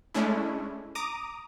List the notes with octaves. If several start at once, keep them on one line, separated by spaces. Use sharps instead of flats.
G#3 A3 C#4 D4 E4
A#5 D6 D#6